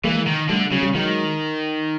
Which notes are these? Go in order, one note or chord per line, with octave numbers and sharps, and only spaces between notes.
E3 G#3 A#3
D#3
D3 G3 A3
C#3 F#3
G3
D#3 F#3 G#3